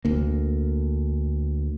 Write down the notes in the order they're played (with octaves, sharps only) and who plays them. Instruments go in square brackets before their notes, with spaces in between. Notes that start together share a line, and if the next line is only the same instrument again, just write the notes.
[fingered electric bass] D2 A#3